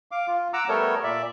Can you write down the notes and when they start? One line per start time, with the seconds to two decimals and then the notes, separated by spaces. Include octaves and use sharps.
0.11 F5 D6
0.27 F4
0.53 F#5 A#5 D6 E6
0.68 G3 A3 B3 A4 A#4 C#5
1.04 A#2 D5 E5